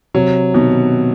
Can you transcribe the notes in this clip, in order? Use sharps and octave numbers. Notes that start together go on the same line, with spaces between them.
C3 F#3
B2 D#3